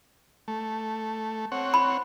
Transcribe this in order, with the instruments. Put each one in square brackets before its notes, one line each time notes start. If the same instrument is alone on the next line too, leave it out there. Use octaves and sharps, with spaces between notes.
[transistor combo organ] A3
C4 C#5 F#5
[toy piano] B5